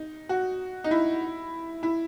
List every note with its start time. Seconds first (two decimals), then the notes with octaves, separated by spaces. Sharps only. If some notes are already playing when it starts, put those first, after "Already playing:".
Already playing: D#4
0.29 F#4
0.84 D#4
0.91 E4
1.83 E4